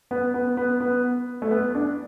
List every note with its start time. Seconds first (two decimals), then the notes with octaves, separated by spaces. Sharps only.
0.11 B3
0.34 B3
0.57 B3
0.80 B3
1.42 A3
1.51 B3
1.75 D4